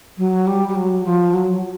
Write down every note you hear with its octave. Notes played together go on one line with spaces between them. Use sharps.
F#3
G3
G3
F#3
F3
F#3